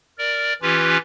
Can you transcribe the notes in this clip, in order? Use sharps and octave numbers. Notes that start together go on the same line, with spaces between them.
A#4 D5
E3 C#4 F4 G4 B4